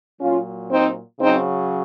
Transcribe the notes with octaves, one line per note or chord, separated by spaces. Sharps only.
A#2 F#3 C#4 F4
C4 D#4
C#3 F#3 C4 D#4